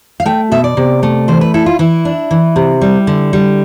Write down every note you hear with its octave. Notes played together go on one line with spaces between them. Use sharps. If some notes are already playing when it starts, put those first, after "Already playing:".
F5
A3 G5
B2 E5
D5
C3
A3
E3 C5
B4
E4 A4
F4
E3 E4
D4
E3
C3
G3
D3
G3